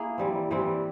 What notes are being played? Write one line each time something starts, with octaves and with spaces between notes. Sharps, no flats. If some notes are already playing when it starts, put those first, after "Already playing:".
Already playing: A#3 E4 G#4
E3 G3 C4
E3 G3 C4